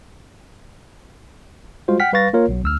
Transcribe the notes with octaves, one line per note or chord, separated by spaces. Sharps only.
G3 G#3 F4 F#4 C5
F#5 G5 F6 B6
G3 B4 F5 C#6 A6 A#6
A#3 F4 A#4 C#5
B1 F#3
D2 E6 F6